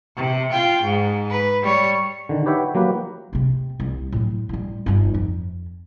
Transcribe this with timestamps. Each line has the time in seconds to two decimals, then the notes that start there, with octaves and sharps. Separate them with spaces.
0.16 C3
0.52 F4 G5
0.83 G#2
1.30 B4
1.63 G3 C#5
2.29 D3 D#3
2.46 G4 B4 C#5 E5 F#5 G5
2.75 F#3 A#3 G4 B4
3.33 C3 C4
3.80 C2
4.12 A2 F#3
4.49 A2 G3
4.86 G1 D#4
5.14 F2